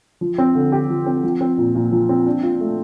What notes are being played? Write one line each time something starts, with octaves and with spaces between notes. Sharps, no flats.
F3
C4
D3
G4
F3
C4
F3
C4
A#2
A#2
F3
C4
D4
F4
A3